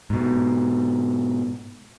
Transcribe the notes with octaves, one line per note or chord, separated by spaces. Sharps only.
G#2 B2